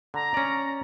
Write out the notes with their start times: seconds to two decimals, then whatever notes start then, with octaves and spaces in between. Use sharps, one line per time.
0.14 D3 A#5
0.34 C#4 D5